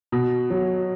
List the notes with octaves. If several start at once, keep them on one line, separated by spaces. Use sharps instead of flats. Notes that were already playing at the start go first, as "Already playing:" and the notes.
B2
F#3